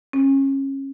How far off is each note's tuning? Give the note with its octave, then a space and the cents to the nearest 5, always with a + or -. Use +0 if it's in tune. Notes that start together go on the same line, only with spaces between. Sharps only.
C#4 -25